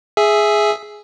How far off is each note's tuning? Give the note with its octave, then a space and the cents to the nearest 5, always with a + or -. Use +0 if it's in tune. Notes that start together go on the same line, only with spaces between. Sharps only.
G#4 +5 E5 +5